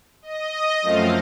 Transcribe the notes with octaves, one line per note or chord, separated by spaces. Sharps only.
D#5
F#2 F3 A3 C4 F5